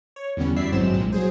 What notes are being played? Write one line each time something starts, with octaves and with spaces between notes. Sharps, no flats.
C#5
E2 D3 G3 B3 C#4
F#2 E4 D5 E5 B6 C7
G#1 G2 F#3 G#3 C4 E7
C2 A#2 G#3
F#3 G#4 C5